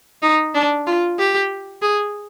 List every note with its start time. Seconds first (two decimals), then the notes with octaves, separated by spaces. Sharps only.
0.22 D#4
0.54 D4
0.86 F4
1.18 G4
1.82 G#4